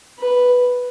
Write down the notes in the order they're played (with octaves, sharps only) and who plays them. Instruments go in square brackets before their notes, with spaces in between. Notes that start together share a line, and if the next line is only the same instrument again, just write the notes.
[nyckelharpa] B4